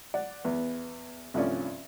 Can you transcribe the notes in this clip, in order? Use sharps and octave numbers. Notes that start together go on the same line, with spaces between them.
D5 F#5
E2 B3
C2 G2 F3 A3 C#4 D5